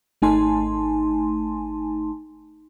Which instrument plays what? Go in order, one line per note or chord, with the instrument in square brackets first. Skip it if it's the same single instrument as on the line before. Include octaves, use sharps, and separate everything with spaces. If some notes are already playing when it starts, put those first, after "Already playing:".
[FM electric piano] G#1 A3 D#4 G#5 A5 C6